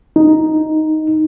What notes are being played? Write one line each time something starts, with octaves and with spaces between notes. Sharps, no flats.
D#4